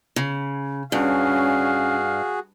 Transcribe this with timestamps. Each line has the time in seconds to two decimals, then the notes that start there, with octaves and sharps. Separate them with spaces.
0.16 C#3
0.92 G2 C#4 F#4 G#4 F5